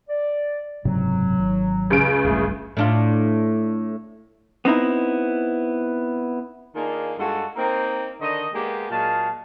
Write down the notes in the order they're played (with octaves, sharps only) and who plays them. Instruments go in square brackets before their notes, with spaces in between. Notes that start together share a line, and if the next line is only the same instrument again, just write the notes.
[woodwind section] D5
[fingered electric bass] F#1 G#2 C3 [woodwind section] F#3
[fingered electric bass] G#1
[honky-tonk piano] C#2 C#3 D7
[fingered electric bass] D1 A1 G2 [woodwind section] A3 G#4
[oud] A2 D4 F4
[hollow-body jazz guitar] B3 C4 D#4 E4
[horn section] D#3 A#3 D4 D#4 F4 G#4
G2 G#3 F4 F#4 A4
A#3 C4 D#4
D3 D#3 D4 D#5
G#3 A#3 B3 G4
A#2 F#3 G#3 G#4 F5 A5